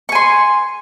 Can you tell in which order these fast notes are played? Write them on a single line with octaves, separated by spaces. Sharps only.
C#6 G#5 C6